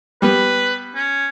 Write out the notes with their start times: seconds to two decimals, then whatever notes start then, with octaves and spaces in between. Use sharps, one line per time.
0.22 G3 B3 B4
0.95 C#4